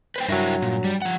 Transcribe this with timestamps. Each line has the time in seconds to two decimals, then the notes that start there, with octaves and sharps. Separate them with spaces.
0.16 B4 C5 G5
0.29 G2 F#3 E4 A#4 E5
0.62 A#2
0.84 G3
1.02 F3 F#5